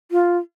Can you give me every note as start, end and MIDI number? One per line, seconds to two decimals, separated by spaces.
0.11 0.38 65